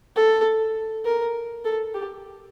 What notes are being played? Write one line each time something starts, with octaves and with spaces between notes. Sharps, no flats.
A4
A#4
A4
G4